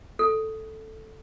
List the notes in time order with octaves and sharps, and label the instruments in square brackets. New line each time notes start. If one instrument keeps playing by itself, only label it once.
[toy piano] A4